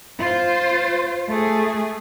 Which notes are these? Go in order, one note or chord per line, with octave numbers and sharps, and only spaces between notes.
F4 C5
A3 G#4